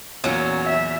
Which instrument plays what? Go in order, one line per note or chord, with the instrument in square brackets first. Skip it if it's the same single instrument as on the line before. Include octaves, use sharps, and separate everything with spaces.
[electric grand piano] E2 A#2 F4 [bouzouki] F#3 C#4
[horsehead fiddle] E5